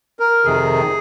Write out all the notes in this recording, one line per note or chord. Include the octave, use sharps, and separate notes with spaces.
A#4
F2 C3 D#3 G#4